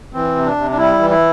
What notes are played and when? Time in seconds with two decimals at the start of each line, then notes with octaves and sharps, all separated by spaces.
0.13 E3 C4
0.35 C3
0.46 D4
0.57 C3
0.71 D4
0.78 G3 E4
0.99 E3
1.10 E4